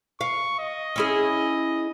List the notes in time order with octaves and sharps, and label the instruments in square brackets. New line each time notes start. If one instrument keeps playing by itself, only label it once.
[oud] F5 [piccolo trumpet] C#6
[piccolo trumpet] D#5
[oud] C#4 E4 G#4